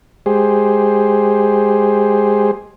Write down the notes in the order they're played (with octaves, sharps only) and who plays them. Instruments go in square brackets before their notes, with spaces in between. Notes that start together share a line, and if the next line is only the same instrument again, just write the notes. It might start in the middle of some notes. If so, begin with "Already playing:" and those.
[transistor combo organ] G#3 G4 G#4 C5